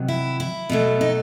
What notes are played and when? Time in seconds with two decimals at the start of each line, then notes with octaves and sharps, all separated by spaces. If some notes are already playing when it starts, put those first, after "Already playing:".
Already playing: C3 D#3 F#3
0.08 E4
0.40 E4
0.70 B2 F#3 A3
1.01 D#4